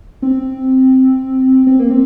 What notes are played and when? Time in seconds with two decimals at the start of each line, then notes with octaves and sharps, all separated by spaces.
0.22 C4
1.67 C4
1.79 A#3
1.91 C4